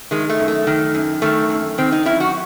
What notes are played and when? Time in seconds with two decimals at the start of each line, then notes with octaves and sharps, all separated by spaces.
0.11 D#3 G#3
0.30 A3
0.40 F#2
0.48 A3
0.67 D#3
0.94 F#2
1.22 D#3 A3
1.50 F#2
1.78 D#3 C4
1.92 D#4
2.05 F#2 E4
2.20 F#4